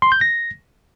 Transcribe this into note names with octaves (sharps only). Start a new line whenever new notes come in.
C6
G6
A#6